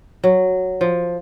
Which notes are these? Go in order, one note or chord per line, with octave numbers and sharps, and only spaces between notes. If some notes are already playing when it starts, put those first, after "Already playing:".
F#3
F3